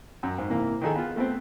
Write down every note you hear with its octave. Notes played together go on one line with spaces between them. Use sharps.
F#2
G#2
C3 E3 A#3
D#3 F3 D#4 G#4 A4
B3 F4
A3 B3 C4